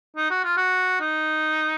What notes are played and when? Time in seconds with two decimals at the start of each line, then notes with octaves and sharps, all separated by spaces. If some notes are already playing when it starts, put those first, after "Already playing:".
0.17 D#4
0.31 F#4
0.44 F4
0.57 F#4
1.01 D#4